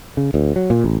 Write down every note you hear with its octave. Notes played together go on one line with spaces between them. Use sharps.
C#3
D2
F#3
A#2
A1